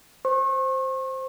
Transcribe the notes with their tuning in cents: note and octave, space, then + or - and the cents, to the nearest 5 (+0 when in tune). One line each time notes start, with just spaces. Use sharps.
C5 +0 C#6 -40